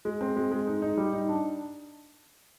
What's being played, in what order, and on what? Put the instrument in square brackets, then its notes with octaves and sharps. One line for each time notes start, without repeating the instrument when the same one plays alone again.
[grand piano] G#3
C4
G#3
G#3
D#4
D#4
G3
D#4
D4